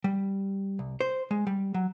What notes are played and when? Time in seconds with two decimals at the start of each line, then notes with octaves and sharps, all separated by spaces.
0.04 G3
0.79 C2
1.01 C5
1.31 G#3
1.47 G3
1.74 F#3